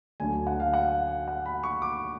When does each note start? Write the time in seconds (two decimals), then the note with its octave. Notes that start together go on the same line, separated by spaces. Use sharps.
0.20 D2 D3 F#3 A3 G#5
0.47 F#5
0.60 F5
0.74 F#5
1.28 F#5
1.46 B5
1.64 C#6
1.82 D6